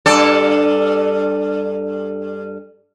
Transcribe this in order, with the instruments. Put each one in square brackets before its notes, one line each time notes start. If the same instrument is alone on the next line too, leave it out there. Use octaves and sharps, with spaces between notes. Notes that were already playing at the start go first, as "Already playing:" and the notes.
[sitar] G2 A4 D5